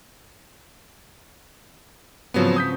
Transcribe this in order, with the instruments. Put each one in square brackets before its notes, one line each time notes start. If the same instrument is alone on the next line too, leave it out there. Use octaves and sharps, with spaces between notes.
[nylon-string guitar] G#2 C#3 C4 [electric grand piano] F3 F#3 B3
[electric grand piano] D#6 G6 B6